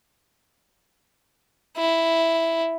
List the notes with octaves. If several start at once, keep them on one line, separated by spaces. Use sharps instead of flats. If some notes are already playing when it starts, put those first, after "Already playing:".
E4